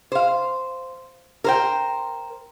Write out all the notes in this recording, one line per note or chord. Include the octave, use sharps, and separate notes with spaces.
C5 F5
A#4 C5 G5